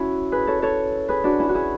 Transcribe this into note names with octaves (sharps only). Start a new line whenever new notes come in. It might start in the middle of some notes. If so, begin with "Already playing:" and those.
Already playing: C#4 E4 F#4
G#4 B4
A4 C#5
A4 C#5
G#4 B4
D4 F#4
C#4 E4
F#4
E4 G#4